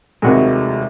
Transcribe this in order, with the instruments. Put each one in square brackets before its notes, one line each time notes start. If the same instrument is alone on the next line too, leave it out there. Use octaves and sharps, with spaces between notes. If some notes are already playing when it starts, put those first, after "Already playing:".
[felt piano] F1 D#2 C3 [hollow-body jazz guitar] G#3 F#4